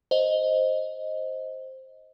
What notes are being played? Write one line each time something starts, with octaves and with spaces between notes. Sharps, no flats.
C5 D#5